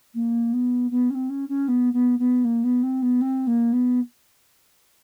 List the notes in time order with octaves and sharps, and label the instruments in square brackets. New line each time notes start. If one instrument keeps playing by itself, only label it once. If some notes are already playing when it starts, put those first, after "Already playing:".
[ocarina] A#3
B3
B3
C#4
C4
C#4
C#4
B3
B3
B3
A#3
B3
C4
B3
C4
A#3
B3